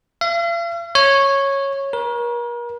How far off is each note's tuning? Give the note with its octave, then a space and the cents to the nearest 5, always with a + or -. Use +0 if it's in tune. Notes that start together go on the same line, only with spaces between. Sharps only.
F5 -45
C#5 -10
A#4 +40